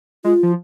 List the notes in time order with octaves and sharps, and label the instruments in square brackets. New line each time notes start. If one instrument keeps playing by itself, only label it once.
[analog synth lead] G#3 [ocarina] F4
[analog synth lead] F3